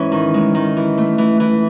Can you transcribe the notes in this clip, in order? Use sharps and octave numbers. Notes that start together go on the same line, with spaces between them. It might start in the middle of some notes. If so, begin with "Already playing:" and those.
Already playing: G#2 E3 C#4
D#3
G#3
D#3
E3
A3
E3
E3